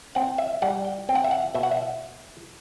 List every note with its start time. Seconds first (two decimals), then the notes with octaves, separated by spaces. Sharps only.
0.15 C4 F#5
0.38 E5
0.62 G3 F#5
0.85 G5
1.09 C4 G5
1.15 F#5
1.24 E5
1.31 F#5
1.55 B2 E5
1.63 F#5
1.71 E5